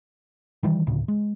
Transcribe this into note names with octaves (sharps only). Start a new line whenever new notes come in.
D#3 E3 G3
D2 A2 C#3
G#3